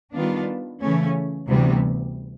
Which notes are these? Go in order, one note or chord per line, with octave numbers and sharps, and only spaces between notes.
D#3 G3 B3 D4 F4
C#3 E3 A3 C#4
D2 C3 E3 G3 B3